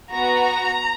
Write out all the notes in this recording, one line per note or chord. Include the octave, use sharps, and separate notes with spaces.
B3 F#4 A#5